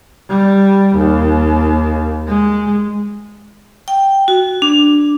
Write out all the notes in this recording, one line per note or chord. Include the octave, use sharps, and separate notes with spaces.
G3
D#2
G#3
G5
F#4
D4